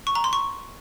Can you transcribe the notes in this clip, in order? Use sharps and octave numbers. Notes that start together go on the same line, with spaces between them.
C#6
A#5
C6
C#6